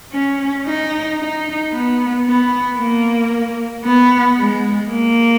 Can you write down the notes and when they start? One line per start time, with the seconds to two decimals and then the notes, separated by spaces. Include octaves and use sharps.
0.12 C#4
0.65 D#4
1.18 D#4
1.71 B3
2.24 B3
2.77 A#3
3.84 B3
4.37 G#3
4.90 A#3